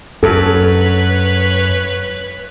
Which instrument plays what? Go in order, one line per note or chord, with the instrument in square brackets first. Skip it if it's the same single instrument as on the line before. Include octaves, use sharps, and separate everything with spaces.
[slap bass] F#2 [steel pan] A4 [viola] B4 C#5